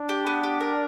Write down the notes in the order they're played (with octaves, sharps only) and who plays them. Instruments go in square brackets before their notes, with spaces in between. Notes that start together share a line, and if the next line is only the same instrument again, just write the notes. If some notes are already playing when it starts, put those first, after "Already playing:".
Already playing: [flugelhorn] D4
[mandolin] G4
B3
G4
A#4